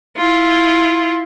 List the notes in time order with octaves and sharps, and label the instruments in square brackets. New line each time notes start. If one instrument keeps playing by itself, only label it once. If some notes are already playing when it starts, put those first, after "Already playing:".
[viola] E4 F4